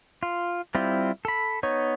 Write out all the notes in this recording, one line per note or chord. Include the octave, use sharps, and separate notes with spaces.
F4
G3 C4 E4 F4
A4 B5
B3 D#4 C#5